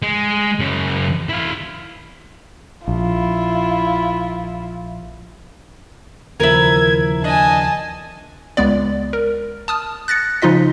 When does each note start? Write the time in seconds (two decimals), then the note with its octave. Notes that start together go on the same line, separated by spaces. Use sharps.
0.02 G#3
0.60 F#2 C#3
1.29 E4 F5
2.88 A#1 E4 F4
6.40 D#2 C#3 F3 E4 A#4 G#6
7.24 D4 D#5 G#5 A5
8.57 C#2 G#3 B3 D5
9.13 A#4
9.68 A5 D#6 F6
10.08 F#6 A6 A#6 C#7
10.42 C#3 F3 D#4 F4 D#5 B6